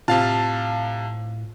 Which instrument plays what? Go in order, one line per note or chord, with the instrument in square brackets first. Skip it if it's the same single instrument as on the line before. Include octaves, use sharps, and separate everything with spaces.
[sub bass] A2 [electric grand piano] C3 F5 A5 [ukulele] F4